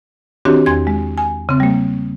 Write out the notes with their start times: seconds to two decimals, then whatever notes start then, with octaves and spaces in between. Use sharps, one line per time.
0.45 D#3 C4 D4 F#4 G4 C#5
0.66 E2 C6 G#6
0.87 G#3
1.18 G#5
1.49 C#3 C4
1.60 G3 A#3